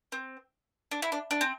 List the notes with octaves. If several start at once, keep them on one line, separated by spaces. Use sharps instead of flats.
C4
D4
E4
D4
D4
C4